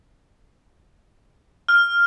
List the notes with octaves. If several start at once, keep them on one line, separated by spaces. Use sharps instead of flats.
F6